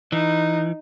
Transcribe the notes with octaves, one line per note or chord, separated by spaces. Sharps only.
E3 D#4